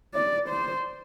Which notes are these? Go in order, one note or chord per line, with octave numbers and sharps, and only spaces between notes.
D5
C5